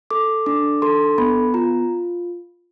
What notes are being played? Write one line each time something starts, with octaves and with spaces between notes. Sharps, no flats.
A4 D6
D4 D6
A4 C6
B3 B5
F4 A#5